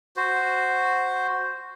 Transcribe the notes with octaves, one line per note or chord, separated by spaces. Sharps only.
F#4 C5